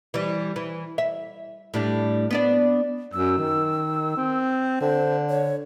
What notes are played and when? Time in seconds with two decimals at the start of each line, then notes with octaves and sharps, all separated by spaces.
0.14 E3 G3
0.56 E3
0.98 E5
1.74 A2 G3 D4
2.31 B3 D4 D5
3.13 F#2 E6
3.38 D#3
4.17 C4
4.81 D3 C5
5.29 C#5